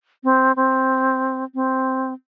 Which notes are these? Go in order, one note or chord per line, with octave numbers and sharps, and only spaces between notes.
C4
C4
C4